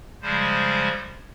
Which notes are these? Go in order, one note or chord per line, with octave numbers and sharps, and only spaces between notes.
C#3 F3 G3 G#3 C5